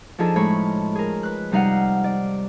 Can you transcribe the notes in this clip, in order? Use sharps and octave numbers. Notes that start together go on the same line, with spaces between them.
F3 D4 D#4 G#4 A4
A2 G#3 C#5 B5
G#4 A#4
B4 F#6
C3 G3 D#4 F5 F#5
D5